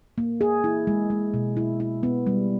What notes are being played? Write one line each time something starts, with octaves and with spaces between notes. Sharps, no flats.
A#3
G#4
E4
G#3
G#3
B2
E4
E4
B3
G3